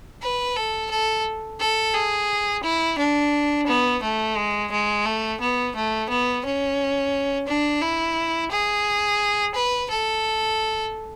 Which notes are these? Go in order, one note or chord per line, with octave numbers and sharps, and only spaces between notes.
B4
A4
A4
A4
G#4
E4
D4
B3
A3
G#3
G#3
A3
B3
A3
B3
C#4
D4
E4
G#4
B4
A4